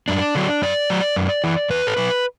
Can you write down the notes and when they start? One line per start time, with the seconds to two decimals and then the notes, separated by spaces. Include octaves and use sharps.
0.08 F#2 D4
0.35 D3 F#3
0.62 F#2 D5
0.90 F#3
1.16 F#2
1.44 E3
1.70 E2 B4
1.87 A4
1.97 B2 F#3 B4